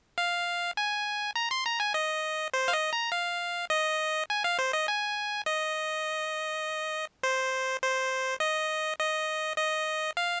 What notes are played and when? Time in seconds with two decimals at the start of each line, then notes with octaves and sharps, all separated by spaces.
0.18 F5
0.77 G#5
1.36 A#5
1.51 C6
1.66 A#5
1.80 G#5
1.94 D#5
2.54 C5
2.68 F5
2.73 D#5
2.93 A#5
3.12 F5
3.70 D#5
4.30 G#5
4.44 F5
4.59 C5
4.73 D#5
4.88 G#5
5.46 D#5
7.23 C5
7.82 C5
8.40 D#5
9.00 D#5
9.58 D#5
10.17 F5